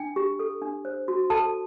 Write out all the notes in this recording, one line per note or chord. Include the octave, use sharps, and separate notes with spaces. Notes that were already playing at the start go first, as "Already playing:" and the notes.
Already playing: D4 G5
G4
A4
D4
C5
F#4
A4 A5